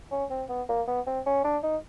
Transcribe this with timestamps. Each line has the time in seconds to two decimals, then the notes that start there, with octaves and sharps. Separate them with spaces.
0.11 C#4
0.30 C4
0.49 B3
0.69 A#3
0.87 B3
1.07 C4
1.26 C#4
1.44 D4
1.63 D#4